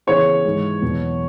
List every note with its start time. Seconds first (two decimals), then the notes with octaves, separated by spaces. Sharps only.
0.07 C#3 E3 B3 E4 G#4 C#5
0.45 G#2 E3 G#3 E4
0.82 E2 B2 F#3